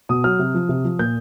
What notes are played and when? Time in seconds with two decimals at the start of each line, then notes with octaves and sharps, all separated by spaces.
0.09 B2 D#6
0.24 F#3 F6
0.39 C3
0.54 F3
0.69 C3
0.84 F3
0.99 A#2 G6